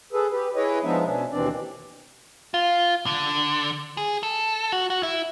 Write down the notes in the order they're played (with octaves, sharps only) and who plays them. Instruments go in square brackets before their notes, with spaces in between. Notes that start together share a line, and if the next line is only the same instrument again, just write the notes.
[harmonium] G#4 A4 B4
G4 B4
E4 G#4 B4 C#5 D#5
F3 G#3 B3 D4 D#4 E5
B2 C#4 D4
D#2 B2 E3 C4 D4 D5
[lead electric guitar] F4
D3
G#4
A4
F#4
F#4
E4